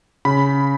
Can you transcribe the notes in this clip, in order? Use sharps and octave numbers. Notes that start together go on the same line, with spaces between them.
C#3 B5